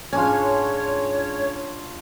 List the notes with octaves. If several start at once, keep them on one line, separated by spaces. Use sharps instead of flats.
G#2 C#4 D4 F4 C#5 G#5